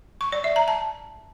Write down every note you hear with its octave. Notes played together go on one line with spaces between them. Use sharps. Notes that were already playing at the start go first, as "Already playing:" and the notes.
C#6
D5
E5
A#5
A5